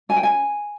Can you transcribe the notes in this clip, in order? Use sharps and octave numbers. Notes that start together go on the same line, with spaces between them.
C#4 G#5
G5
G#5